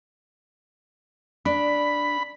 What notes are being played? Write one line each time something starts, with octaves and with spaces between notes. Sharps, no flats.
D4 B5